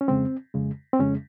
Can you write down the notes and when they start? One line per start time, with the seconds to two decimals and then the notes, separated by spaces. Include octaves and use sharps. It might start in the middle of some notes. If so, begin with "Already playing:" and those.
0.01 C#4
0.08 F2 C#3 G#3 C4
0.54 F2 C#3 G#3
0.93 C4
0.99 F2 C#3 G#3 C#4